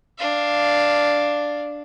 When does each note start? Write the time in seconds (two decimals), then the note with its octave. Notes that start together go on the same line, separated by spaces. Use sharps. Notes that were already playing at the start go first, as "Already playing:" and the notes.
0.18 D4 F5